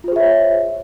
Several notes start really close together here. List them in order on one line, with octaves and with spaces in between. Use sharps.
F4 C5 G#4 E5 C#5